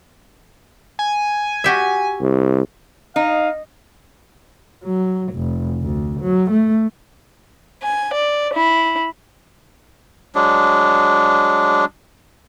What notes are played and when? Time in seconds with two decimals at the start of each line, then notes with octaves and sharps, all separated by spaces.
0.99 G#5
1.64 F#4 G4 E5
2.21 C2
3.16 D#4 F5
4.84 F#3
5.34 F1
5.82 D2
6.22 F#3
6.51 A3
7.82 G#5
8.15 D5
8.53 E4
10.35 F#3 G#3 D4